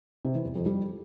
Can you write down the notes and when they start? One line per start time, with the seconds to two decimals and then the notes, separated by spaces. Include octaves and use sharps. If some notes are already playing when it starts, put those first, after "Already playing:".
0.25 C3
0.35 E3
0.45 E2
0.56 F2
0.66 G3